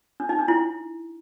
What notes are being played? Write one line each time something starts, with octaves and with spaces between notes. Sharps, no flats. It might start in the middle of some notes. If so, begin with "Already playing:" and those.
D4
D#4
D4
E4